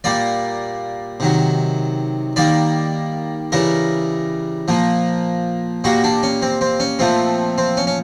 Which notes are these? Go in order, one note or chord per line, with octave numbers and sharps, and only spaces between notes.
A#2 G3 A#3 D5
C3 D#3 F#3
D#3 G3 A#3 D5
C#3 E3 G3 A#4
A#2 F3 A#3
A#2 G3 A#3 F#4
D4
C#4
C4
C4
C#4
A#2 F3 A3 C4
C4
C#4
C#4